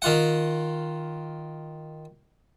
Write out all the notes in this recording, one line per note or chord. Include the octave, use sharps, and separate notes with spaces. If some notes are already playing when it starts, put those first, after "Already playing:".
D#3 F4 F#5